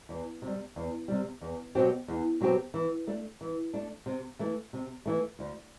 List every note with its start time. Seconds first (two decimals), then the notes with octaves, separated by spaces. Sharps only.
0.09 E2
0.42 C3
0.47 G3
0.76 E2
1.08 C3 G3
1.41 E2
1.75 B2 F#3 C4 G4
2.08 E2
2.41 B2 F#3 C4 G4
2.74 E3
3.07 A3 D4
3.41 E3
3.74 A3 D4
4.06 C3
4.39 E3 A3
4.73 C3
5.06 E3 A3
5.39 D2